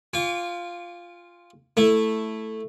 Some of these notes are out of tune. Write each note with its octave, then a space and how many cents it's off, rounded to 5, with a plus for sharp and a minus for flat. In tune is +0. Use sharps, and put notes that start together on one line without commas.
F4 +0 G#5 -45 D6 -45
A3 +0 E4 +0